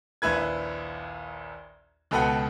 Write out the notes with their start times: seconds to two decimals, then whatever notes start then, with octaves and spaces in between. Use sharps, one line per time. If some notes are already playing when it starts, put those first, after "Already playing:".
0.22 A#1 D#2 E4 B4 G#6
2.11 C#2 B2 A4 B4 F#5 G5